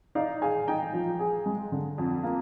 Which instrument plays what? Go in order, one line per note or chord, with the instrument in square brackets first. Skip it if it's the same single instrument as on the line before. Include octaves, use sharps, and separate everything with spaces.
[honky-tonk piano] D#4 [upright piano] D5 F5
[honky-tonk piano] G#4 [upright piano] F5 G#5
[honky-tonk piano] D#4 [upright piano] G5 A#5
[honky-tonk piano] F3
G#4
G#3
D3
F2
A#3